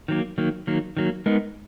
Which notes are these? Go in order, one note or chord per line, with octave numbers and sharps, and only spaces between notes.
D#3 F#3 A#3
D#3 F#3 A#3
D#3 F#3 A#3
D#3 F#3 A#3
G#3 B3 D#4 A#4